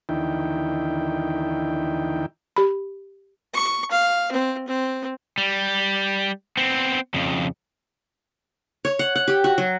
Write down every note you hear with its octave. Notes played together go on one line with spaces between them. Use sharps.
D#2 D3 E3 D#4 E4 G5
G4 B5
C#6
F5
C4
C4
G3
B3 C4
F2 C#3
C#5
F#5
F#5
G4
F#4
F#3